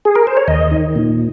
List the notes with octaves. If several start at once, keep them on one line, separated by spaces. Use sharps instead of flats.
G#4
A#4
C5
C#5
D#2 D#5
D#3
A#2